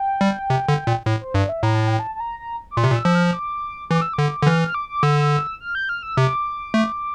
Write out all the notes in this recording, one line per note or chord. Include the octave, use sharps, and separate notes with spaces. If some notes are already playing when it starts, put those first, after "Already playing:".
Already playing: G5
G3
C3
D3
A#2
A2
C5
G2 D5
E5
A2 A#5
A5
G5
A5
A5
A#5
A#5
D6
A#2 C6
C3
A#2
E6
F3
F6
D6
E3 D6
E6
D3 D6
D3
E3 F6
F6
D6
D6
D3 E6
F6
G6
F6
E6
C3 D6
A3